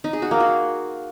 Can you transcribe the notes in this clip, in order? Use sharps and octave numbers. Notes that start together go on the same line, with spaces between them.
D#4
G#4
F#4
A#3
F#4